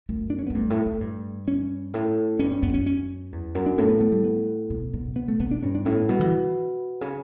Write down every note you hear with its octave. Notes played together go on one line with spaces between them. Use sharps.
F#2 A3
D4
C#4
A2 B3
G2 A3
A2
A2
G2
C#4
A2
G2 C#4
C#4
F#2 B3
C#4
C#4
E2
F#2
D4
A2 C#4
B3
A3
G3
B3
B2
B2
B2 B3
A3
B2 B3
D4
G2 C#4
D4
A2 C#4
B3
B2 G3
D3
E3
C#3